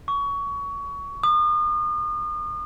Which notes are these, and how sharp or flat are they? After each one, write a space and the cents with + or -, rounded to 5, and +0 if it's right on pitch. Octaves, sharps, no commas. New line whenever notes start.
C#6 +25
D#6 -40